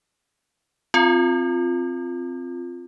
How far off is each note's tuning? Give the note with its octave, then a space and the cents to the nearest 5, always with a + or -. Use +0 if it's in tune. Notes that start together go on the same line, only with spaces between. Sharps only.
C4 +0 F4 +0